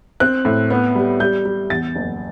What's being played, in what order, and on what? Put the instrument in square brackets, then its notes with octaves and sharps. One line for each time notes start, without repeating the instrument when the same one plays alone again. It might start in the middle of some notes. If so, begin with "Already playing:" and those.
[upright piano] C4 F#6
A2
B3
G3
G3 G6
G3
E2 A6
F#1